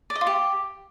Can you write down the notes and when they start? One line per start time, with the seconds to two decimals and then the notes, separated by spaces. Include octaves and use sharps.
0.10 D5
0.16 D#5
0.21 F4
0.27 G4